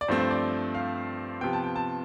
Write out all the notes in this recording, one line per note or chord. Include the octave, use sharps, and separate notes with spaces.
D5
G2 F3 A3 C4 C5
C5
D5
F5
C3 F3 B3 G5
A5
G5
A5